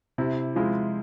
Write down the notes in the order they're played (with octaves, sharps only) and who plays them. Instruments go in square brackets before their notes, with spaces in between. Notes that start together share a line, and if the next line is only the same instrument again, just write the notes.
[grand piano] C3 [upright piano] E4
[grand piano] F3 G#3 E4 [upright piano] F4